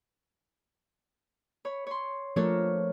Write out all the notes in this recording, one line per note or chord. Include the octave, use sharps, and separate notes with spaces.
C#5 B5
C#5 C6
F3 A3 D4 A#4 C#5